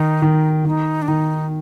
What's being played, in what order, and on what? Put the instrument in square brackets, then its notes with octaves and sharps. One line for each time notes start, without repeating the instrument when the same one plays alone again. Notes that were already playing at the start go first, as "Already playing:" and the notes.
Already playing: [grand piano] D#3 [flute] D#4
[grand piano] D#3
[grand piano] D#3 [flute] D#4
[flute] D4
[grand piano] D#3 [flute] D#4